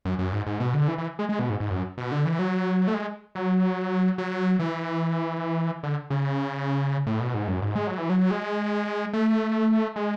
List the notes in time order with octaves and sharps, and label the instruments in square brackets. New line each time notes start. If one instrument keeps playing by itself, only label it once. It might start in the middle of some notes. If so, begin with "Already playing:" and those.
[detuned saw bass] F#2
F#2
G#2
G#2
B2
D3
E3
E3
G#3
G#3
B2
G#2
G#2
F#2
B2
D3
E3
F#3
A3
G#3
F#3
F#3
E3
D3
C#3
A2
B2
G#2
F#2
G#2
G#3
F#3
E3
F#3
G#3
A3
G#3